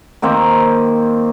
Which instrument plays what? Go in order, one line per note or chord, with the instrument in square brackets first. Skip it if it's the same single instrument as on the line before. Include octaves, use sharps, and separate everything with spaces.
[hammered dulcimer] D#3 A#3 C4 C5